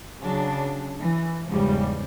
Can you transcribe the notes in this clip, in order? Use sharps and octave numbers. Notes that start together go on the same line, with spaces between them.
C#3 F#3 D4
E3
E2 G#2 C#3 F3 G3